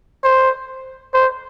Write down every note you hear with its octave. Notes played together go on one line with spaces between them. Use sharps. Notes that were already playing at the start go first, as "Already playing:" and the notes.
C5
C5